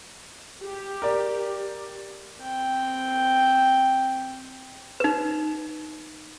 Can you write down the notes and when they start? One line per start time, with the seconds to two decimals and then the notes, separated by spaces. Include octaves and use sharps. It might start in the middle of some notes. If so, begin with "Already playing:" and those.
0.64 G4
1.02 A#4 D5
2.42 C4 G5
5.00 D#4 B4